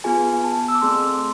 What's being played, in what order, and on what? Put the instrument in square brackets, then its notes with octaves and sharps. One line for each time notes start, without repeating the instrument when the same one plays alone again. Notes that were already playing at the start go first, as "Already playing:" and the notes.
[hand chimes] B3 F4 G#4 G#5
A5
E6
D6
A3 C4 G#4 C6